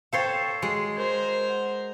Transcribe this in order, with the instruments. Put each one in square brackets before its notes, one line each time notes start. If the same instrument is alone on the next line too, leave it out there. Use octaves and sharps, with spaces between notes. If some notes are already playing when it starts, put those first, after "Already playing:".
[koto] A4 C5 C#5 [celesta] F5 G5
[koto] G#3 [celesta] F#4
[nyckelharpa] A#4 C5 [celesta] G#6
[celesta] F#5